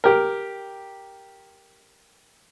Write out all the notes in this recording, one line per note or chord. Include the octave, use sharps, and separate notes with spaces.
G4 A#4